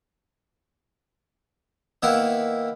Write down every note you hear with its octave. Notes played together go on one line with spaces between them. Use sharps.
D#3 A#3 B3 E4